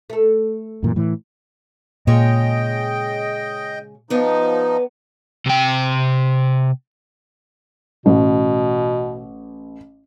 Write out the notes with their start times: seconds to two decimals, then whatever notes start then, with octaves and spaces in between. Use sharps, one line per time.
0.10 A3 A4
0.83 F#2 A#2 E3
0.96 A2 E3
2.07 A#2 C#3 G#3 C#5 D#5 G5
4.10 F3 B3 D4 D#4
5.46 C3 G5
8.06 A1 B2